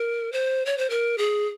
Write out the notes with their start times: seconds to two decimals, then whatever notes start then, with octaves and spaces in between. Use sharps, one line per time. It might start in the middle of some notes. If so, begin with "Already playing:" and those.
Already playing: A#4
0.32 C5
0.66 C#5
0.78 C5
0.90 A#4
1.18 G#4